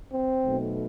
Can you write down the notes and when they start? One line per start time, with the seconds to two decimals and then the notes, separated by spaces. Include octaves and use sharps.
0.12 C4
0.44 B1 B2 A3